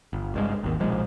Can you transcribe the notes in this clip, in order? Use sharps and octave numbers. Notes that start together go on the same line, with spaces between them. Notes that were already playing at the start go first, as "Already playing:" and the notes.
G1
C2 G2 G#3
G#1 D#2
B1 A#2 F3 G#3